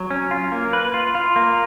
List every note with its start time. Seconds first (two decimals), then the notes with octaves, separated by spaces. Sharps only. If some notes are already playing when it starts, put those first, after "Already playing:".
Already playing: F#3
0.10 C#4
0.31 F4
0.52 A#3
0.73 B4
0.94 F4
1.15 F4
1.36 A#3